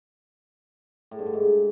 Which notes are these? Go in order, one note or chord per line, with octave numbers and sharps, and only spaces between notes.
A2
G2
D3
G#2